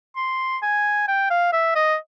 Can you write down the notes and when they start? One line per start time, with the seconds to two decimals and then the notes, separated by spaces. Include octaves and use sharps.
0.16 C6
0.63 G#5
1.08 G5
1.30 F5
1.53 E5
1.76 D#5